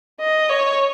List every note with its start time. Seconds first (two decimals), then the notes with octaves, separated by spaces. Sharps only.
0.20 D#5
0.50 C#5